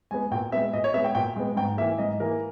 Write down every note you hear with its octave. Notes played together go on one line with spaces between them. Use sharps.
G#3 B3 G#5
A#2 G5
G#3 B3 E5
A#2 D#5
C#5
G#3 B3 E5
G5
A#2 G5
G#3 B3
G#2 G5
E3 A#3 E5
G#2 D#5
E3 A#3 A#4